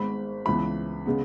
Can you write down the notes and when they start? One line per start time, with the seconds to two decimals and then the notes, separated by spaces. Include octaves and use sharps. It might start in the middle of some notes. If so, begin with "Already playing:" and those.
Already playing: G#1 G#2 G#3 B3 B5
0.46 C#2 C#3 E3 B3 B5
1.06 C#3 G#3 B3